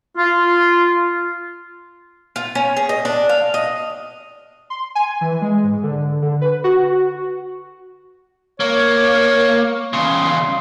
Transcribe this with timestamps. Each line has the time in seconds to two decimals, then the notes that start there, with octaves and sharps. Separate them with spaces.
0.18 F4
2.36 F4
2.55 C#4
2.77 G#4
2.89 D#5
3.05 D4
3.29 F5
3.54 D#5
4.70 C6
4.95 G#5
5.21 E3
5.42 G#3
5.63 G#2
5.83 D3
6.22 D3
6.41 B4
6.64 F#4
8.60 A#3 C#5
9.93 E2 C#3 C6